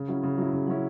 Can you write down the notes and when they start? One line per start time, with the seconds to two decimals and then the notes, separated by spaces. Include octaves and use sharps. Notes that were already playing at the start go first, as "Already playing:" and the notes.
Already playing: C#3
0.08 F#3 C#4 E4
0.23 C#3
0.38 F#3 C#4 E4
0.53 C#3
0.68 F#3 C#4 E4